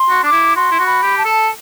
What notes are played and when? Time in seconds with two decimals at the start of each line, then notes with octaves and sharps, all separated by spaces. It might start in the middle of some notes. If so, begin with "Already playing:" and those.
Already playing: C6
0.10 F#4
0.24 D4 D6
0.32 E4
0.56 F#4 C6
0.72 E4
0.79 F#4
0.86 B5
1.02 G4
1.18 A5
1.25 A4